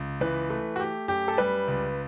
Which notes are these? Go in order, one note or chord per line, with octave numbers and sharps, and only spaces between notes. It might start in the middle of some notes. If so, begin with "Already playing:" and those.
Already playing: C#2
E3 B4
A3
F#4
A3 G4
F#2 G4
A4
G3 B4
C#2